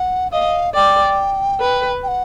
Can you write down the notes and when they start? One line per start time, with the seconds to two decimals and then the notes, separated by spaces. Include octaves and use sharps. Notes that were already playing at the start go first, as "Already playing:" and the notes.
Already playing: F#5
0.31 D#5 F5
0.75 D5 G5
1.60 B4
2.03 G5
2.08 F#5